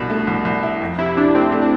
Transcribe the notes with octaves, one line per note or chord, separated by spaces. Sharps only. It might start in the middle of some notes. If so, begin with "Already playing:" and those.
Already playing: C2 B2 D4
A3
C2
C2
E4
F2
C3 E4
C3 D4
A3 C4
A3
D4